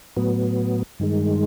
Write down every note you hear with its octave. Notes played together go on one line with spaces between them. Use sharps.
A2 F#3 B3
G2 D#3 G#3